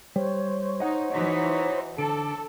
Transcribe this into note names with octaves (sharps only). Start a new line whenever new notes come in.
G3 C5 C#5
D#4 D#5 F#5
E3 D#4 F#4
D3 A4 D6